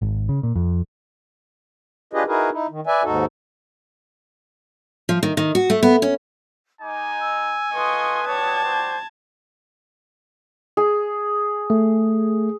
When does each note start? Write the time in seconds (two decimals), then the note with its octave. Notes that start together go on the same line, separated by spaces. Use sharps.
0.02 G#1
0.29 C#3
0.43 A#2
0.55 F2
2.13 D4 F4 G4 G#4 B4 D#5
2.27 D#4 E4 F#4 G#4 A#4 B4
2.52 D#4 E4
2.70 D#3
2.87 B4 D5 E5 G#5
3.03 D#2 G#2 D#4 F#4 A4
5.09 F3
5.23 D#3
5.37 D#3
5.55 F#4
5.70 A3
5.83 B3
6.02 C#4
6.81 G#3 D#4 G#5 D6
7.18 E6
7.74 F4 A4 B4 D#5 C6 C#6 D#6
8.27 F#4 C#5 D5 G5 A5 G#6
8.64 C5
10.77 G#4
11.70 A3